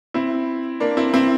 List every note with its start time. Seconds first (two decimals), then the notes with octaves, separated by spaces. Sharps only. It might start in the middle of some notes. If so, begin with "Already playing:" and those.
0.14 C4 E4
0.80 A#3 D4
0.97 C4 E4
1.14 C4 E4